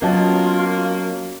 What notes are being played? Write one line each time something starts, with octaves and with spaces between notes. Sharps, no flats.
F#3 A#3 B3 C#4 F4 D#5 A5